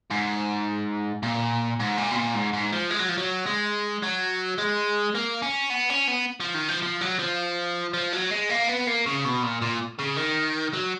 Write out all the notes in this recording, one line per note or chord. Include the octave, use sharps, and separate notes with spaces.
G#2
A#2
G#2
A#2
B2
A#2
G#2
G#2
F3
G#3
F#3
F3
F#3
G#3
F#3
G#3
A#3
C#4
B3
C#4
B3
F3
D#3
F3
F3
F#3
F3
F3
F#3
G#3
A#3
B3
A#3
C#3
B2
A#2
A#2
C#3
D#3
F#3